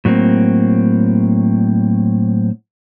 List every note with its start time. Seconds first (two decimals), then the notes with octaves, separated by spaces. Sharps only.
0.05 A2 F#3 A#3 C4